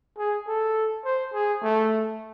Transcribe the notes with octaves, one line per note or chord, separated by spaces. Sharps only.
G#4
A4
C5
G#4
A3